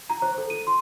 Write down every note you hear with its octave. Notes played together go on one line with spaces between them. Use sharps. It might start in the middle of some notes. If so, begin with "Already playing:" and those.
A#5
C5
A4
D#7
C6